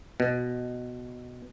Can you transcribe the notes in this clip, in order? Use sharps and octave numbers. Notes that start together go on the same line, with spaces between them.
B2